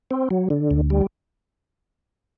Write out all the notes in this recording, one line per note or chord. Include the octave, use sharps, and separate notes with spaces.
C4
F#3
D3
D2
G3